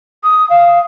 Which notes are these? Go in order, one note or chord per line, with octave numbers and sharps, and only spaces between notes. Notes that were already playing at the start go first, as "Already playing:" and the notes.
D#6
F5